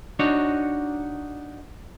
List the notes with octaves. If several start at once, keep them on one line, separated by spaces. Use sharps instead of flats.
D4 D#4 F#4 C#5